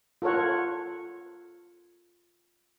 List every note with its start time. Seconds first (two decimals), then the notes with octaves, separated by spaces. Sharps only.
0.22 F4 A4 A#4 C#5 F#5